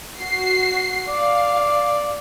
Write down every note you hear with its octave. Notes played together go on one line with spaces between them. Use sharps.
F#4 C7
D5 F5